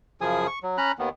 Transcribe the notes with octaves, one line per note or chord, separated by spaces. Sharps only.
F#2 C#3 F3 G#4 G#5 D#6
C#6
F#3
C#4 A#5 B5 F#6
D#2 D#3 B3